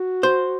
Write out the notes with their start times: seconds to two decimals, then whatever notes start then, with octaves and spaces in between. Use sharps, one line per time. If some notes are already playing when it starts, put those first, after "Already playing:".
Already playing: F#4
0.23 C5